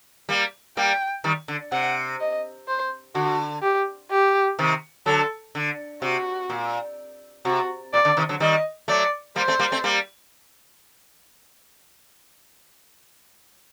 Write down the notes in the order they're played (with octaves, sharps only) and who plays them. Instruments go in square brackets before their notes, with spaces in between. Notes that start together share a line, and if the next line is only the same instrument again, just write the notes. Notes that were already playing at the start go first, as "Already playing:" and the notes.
[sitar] G3 A#3
[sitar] G3 A#3 [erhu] G5
[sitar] D#3 G3
D3
[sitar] C3 [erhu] F#5
[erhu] D#5
C5
[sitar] D3 [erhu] F#4
[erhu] G4
G4
[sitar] C3 D#3
[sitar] D3 F#3 [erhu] A4
[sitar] D3
[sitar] C3 [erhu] F#4
[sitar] A#2
[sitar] C3 [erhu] F#4
[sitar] A#2 [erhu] D5
[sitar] D3
C3 D#3
D3 F#3
[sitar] D#3 G3 [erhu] D#5
[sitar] F#3 A3 [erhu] D5
[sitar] G3 A#3 [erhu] C5
[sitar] A3 C4
G3 A#3
A3 C4
G3 A#3